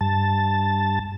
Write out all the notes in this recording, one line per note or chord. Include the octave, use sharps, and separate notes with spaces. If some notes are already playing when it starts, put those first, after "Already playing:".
G2 A5